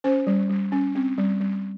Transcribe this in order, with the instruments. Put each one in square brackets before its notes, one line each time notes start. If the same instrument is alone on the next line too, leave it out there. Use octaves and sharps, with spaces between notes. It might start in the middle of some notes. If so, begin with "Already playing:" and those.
[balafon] C#4 C5
G3
G3
C#4
C4
G3
G3